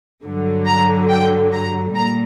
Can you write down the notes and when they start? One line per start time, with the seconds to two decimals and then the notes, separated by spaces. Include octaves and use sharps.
0.24 G2 D3 F#3
0.66 A#5
1.10 G5
1.53 A#5
1.95 A#2 G3 A#5